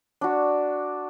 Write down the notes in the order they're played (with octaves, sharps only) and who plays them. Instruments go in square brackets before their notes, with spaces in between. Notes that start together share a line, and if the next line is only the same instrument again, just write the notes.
[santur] D4 F#4